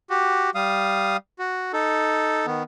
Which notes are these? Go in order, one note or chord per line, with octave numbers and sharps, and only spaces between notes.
F#4 G4
G3 F5 D#6
F#4
D#4 A4
D#3 B3